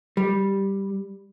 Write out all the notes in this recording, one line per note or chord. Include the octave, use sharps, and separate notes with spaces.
G3